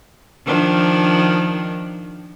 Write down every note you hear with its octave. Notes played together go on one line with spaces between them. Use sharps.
D#3 F3 D4